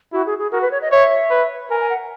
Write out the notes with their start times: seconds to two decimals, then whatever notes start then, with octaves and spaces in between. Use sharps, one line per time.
0.12 E4 F#4
0.26 G#4
0.38 G#4
0.51 F#4 A#4
0.61 B4
0.71 C#5
0.82 D#5
0.91 C#5 E5
1.31 B4
1.70 A#4 G#5
1.80 G#5
1.90 F#5